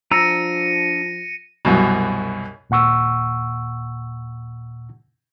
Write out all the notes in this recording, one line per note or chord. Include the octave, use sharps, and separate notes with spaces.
F3 D4 A#5 E6 A#6 C#7 D#7
C2 F#2 B2
D#2 A#2 F#5 C#6 E6